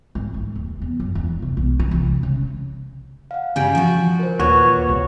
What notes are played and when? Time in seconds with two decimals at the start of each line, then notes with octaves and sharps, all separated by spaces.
0.15 G#1
0.34 A3
0.56 D#2
0.82 E2
1.00 F#2
1.15 E2
1.42 C3
1.57 B1
1.80 E3
1.91 C2
2.23 C#3
3.31 F5 F#5
3.56 G2 C#3 G3 G#5 G6 D7
3.75 F3 F#4
4.19 A#4 C5
4.40 D#2 A#2 F4 F#4 B4 C#5
4.89 C2